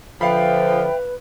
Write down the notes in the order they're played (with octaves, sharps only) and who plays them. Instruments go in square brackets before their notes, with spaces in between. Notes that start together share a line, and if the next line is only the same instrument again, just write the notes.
[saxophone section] D3 F3 [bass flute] B4 [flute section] E5 G5 [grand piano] F5 B5